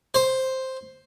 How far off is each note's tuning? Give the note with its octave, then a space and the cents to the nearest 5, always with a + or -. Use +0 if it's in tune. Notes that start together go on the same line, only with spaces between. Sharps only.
C5 +0